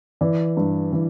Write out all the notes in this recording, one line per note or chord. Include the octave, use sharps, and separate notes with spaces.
E3 D5
G2
E3